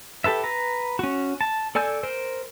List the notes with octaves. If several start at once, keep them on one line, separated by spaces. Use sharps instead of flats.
G4 A4 B4 E5
B4 A#5
C#4 F#4
A5
A4 D5 G#5 E6 G6
A#4 C5